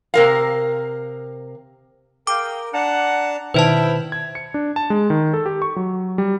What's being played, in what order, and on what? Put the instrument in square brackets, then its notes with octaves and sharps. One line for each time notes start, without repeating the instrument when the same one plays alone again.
[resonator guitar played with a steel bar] C3 A#4 F5
[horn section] G#4 F5 G5 [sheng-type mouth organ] A#4 [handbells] D6
[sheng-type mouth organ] D4 A5 A#5 [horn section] F#5
[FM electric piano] B2 D#3 [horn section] G3 E4 [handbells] B4 C5 A5 [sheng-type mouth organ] G5
[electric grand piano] G#6
C#7
D4
A5
G#3
D#3
A4
G4
C#6
F#3
G3